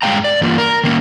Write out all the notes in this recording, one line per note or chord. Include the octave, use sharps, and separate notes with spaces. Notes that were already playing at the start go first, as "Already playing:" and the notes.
G2 G#3 A#3 F5 G5 A#5
D5
G2 E3 A#3 F4
A#4
D#3 A#3 C#4